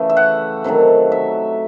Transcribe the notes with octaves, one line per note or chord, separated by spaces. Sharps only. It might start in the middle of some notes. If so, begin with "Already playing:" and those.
Already playing: C#3 E3 A3
E5
F#5
C3 D#3 F#3 A3
E5